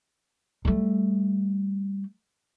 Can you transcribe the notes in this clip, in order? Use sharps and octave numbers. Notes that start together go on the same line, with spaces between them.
G3 A3